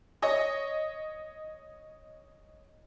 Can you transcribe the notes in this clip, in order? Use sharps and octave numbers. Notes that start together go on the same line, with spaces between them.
C#5 D#5